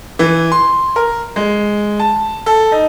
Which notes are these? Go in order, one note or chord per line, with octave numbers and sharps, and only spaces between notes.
E3
C6
A#4
G#3
A5
A4
D#4